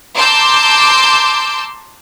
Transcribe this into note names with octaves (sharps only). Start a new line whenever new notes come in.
A5 A#5 C6 D6 E6 G6